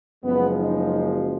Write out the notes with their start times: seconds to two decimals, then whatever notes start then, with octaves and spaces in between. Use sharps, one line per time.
0.24 F#1 F#2 F3 G#3 B3
0.59 D#4